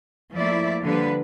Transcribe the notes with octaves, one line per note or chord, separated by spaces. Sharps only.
F3 A3 A#3 E4 D5 E5
D3 F3 G3 A#3 B4